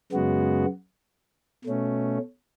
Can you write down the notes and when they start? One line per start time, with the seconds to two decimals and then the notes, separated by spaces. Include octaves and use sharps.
0.12 F#2 C#3 G#3 B3 F#4
1.64 B2 A3 C#4